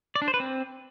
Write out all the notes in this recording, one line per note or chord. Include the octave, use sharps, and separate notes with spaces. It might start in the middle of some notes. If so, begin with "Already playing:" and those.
D5
D4
C5
B4
C4